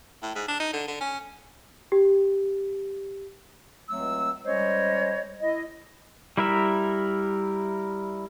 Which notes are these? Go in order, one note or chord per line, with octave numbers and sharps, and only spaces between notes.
A2
G#2
D4
D#4
D3
D3
C#4
G4
C#2 F#3 A3 C4 E6
G3 G#3 C#4 C5 C#5 D#5
E4 D#5
G3 E4 A#4 E5